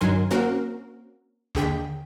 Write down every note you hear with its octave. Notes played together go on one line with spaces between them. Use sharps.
G2 D#3 F#3 A#4 G#5 C6
A#3 C4 C#4 F#4 A#4
D#2 D3 G#4 G5 B6